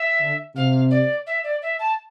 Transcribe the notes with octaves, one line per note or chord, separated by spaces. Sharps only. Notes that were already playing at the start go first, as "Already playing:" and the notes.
Already playing: E5
D3
C3 F5
D5
E5
D5
E5
A5